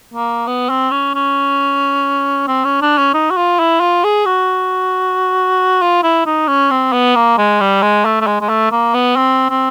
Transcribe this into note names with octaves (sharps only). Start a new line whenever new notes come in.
A#3
B3
C4
C#4
C#4
C4
C#4
D4
C#4
D#4
F#4
F4
E4
F4
G#4
F#4
F4
E4
D#4
C#4
C4
B3
A#3
G#3
G3
G#3
A3
A3
G#3
G#3
A3
A#3
B3
C4
C4